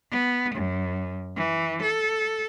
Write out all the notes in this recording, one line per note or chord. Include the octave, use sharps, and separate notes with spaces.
B3
F#2
E3
A4